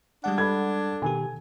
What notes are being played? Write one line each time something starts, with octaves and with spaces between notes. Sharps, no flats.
G3 G#3 D4 F#5
A4 B5 G#6
B2 D#3 G4 G#5